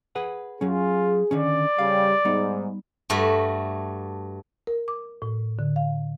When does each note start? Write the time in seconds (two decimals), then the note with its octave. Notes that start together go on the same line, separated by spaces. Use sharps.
0.15 G#4 B4 F#5
0.61 F#3 C#4 F4 G#4
1.31 D3 D#3 C#4 D5
1.79 C#3 G3 F5
2.25 G#2 G3 B3 D#4
3.10 G2 A3 F#4
4.67 A#4
4.88 D6
5.22 A2
5.59 D3
5.76 F5